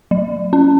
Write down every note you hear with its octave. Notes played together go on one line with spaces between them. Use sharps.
F#3
C#4